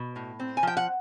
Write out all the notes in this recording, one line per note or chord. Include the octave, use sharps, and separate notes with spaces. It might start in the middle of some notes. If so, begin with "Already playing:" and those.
Already playing: B2
A2
C4
G#5
F3 G5
F#5